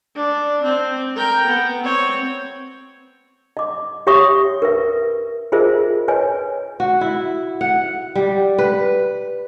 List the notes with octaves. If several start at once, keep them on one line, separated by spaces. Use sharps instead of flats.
D4
C4
A#4 G5
B3
C4 C#5
D#5 D6
G4 C#5 E5 C#6 D#6
A#4 B4 E5
F4 G#4 A#4 C5 D#5 E5
B4 C#5 D#5 G#5
F#4
E4
F#5
G3
B4